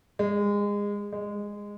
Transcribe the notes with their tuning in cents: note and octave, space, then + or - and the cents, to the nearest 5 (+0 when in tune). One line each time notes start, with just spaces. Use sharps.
G#3 -25
G#3 -15